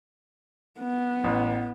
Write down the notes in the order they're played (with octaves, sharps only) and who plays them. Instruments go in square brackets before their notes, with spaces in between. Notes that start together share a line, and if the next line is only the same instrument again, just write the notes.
[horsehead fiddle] B3
[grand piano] A1